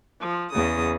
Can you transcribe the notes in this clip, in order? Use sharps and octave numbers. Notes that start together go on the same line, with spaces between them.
F3
E2 C#3 D#6